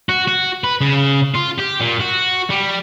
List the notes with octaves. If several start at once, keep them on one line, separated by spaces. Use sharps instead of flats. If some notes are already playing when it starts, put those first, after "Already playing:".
F#4
F#4
B4
C#3
F4
G4
A#2
F#4
G3